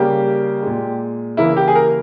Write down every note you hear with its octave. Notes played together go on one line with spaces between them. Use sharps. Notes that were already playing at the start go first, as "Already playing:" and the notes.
Already playing: C#3 G3 A#3 G4
A#2 G#3
C#3 E3 A#3 E4
G4
G#4
A#4